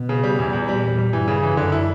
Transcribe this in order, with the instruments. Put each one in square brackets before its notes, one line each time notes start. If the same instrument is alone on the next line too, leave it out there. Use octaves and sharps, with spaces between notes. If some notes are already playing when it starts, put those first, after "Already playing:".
Already playing: [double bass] B2
[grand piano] C#3
G3
E2
E2
[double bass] A#2 [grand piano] G3
[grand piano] G3
G3
[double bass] G2 [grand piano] E3
[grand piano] C#3
E3
[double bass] F#2 [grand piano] D3
[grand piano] E4